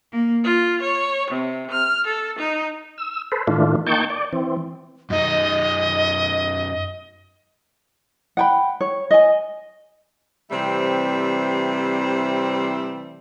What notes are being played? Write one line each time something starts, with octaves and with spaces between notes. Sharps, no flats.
A#3
F4
C#5
C3
F6
A4
D#4
E6
A4 B4 C5
A2 D#3 E3 A3 D4 F4
A#3 D#4 G5 A5 C#6 G6
D5
E3 C4
F#2 D#4 D#5
F#5 G5 B5
C#5
D#5 G#5
C3 E3 G3 A3 C4